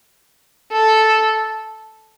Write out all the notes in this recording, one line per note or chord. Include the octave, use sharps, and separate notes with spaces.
A4